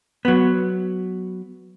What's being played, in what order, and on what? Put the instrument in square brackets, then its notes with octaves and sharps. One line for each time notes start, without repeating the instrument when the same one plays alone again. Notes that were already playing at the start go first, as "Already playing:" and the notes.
[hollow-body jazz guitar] F#3 B3